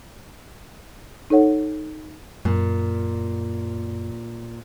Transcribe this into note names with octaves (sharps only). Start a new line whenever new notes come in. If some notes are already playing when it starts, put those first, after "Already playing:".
D#4 A4 C#5 F#5
F#2 A#2